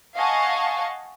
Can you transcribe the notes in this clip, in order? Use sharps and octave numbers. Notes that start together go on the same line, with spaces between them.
D#5 F5 F#5 G#5 A5 C#6